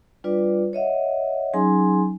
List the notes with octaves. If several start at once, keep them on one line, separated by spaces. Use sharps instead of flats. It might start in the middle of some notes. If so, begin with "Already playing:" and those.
G3 D4 F4 B4 D5
C#5 D#5 E5 F#5
F#3 C#4 D#4 G#4 G#5 C6